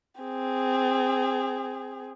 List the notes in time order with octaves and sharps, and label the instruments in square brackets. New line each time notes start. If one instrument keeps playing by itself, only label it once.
[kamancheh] C4 G#4